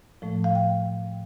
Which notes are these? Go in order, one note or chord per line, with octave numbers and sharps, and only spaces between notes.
A2 F3 A3
F5
G5